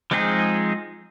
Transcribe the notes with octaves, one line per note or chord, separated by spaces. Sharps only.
F3 G#3 C4 D#4 G#4